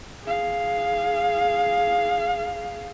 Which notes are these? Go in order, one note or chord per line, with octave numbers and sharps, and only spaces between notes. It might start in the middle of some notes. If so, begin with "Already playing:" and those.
G#4 F5